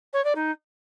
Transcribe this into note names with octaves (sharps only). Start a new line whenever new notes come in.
C#5
D5
D#4